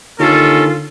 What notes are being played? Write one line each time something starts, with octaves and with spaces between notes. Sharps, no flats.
D#2 D3 C#4 F4 A4